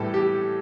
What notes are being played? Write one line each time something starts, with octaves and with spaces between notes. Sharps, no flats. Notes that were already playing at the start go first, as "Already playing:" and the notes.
Already playing: A2 E3 G3 A4
G4